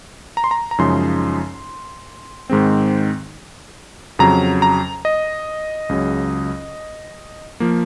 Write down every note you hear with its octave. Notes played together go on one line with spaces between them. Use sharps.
A#5
C6
A#5
A#5
F#2 C#3 F3 G#3 D#4 C6
G#2 D#3 G#3 C4
F2 C#3 F#3 A#5
A#5
D#5
C#2 C#3 F#3
F3 A#3